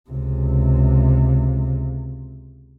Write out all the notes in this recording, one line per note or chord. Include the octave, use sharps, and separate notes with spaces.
C#2 C3